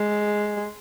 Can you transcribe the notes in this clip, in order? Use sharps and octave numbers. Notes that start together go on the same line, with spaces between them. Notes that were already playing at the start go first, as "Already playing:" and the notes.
Already playing: G#3